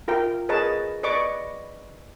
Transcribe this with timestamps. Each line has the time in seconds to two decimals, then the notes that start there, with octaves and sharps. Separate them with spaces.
0.08 F4 A#4 E5 G5
0.49 G#4 A#4 B4 C#5 D#5 A5
1.03 B4 D5 D#5 C#6 D6